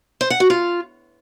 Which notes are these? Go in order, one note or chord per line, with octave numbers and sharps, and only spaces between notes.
C5
F#5
F#4
F4